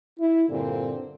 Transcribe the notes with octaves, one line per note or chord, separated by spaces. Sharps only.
E4
G2 A#2 D3 C4